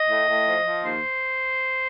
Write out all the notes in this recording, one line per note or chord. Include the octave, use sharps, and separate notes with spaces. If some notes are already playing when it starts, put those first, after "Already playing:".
Already playing: D#5
A2
A2
F3
F3
D#2 C5